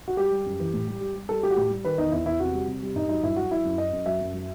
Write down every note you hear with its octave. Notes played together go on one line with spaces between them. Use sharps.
F#4
G3 G4
G3
F#2
E3
A2
G3
G3
G3
G3 A4
G3 G4
F#4
A2 G4
G3
D#3 B4
E2 D#4
E2 E4
E2 E4
C3 F#4
G3
C3
G3
G2 D#4
F#3 D#4
G2 E4
F#3 F#4
F#3 E4
F#2
F#2 D#5
F#2
F#3 E5
F#2
F#3